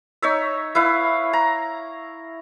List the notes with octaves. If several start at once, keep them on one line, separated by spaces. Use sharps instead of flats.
D#4 C#5 E5
E4 B4 F5
A#5